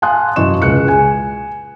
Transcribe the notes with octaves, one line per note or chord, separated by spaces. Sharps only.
F5 G#5 A5 C6 D#6 F#6
F#2 E3 E4 D#5 C#6 E7
C#2 G#4 F#6 C#7
G#5